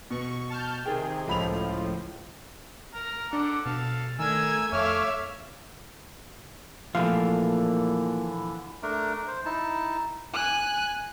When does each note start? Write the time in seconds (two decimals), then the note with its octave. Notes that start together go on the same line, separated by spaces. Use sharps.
0.10 B2 C#6
0.50 A5 F6 G6
0.86 C3 D#3 G#4 G5
1.27 C#2 A2 F3 B5 F7
2.95 A#5 F6
3.33 D4 A4 F#5 D6
3.66 B2 A4 F5 A5
4.19 D#3 A3 D4 A#4 G#5 E6 G#6
4.73 F2 A3 C#5 E5 F5 D6 F6
6.95 A#2 D3 E3 F3 A3 F5
8.82 A3 D4 A#4
9.27 C5
9.46 D#4 E4 A5
10.33 G#5 F#6